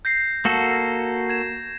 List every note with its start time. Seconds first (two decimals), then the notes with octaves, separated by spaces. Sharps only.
0.05 G6 A#6 C7
0.45 A#3 F#4 A4 A#6
1.29 G#6 E7